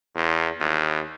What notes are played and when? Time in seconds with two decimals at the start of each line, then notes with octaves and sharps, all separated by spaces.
0.15 E2
0.60 D#2